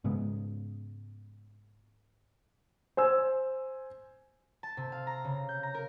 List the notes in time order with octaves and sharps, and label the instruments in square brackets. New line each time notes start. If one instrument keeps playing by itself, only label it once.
[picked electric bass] G#2 C#3 G#3 B3
[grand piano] C5 G#5 E6
[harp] A5
C3
F5
A#5
C#3
G6
A#5
A#4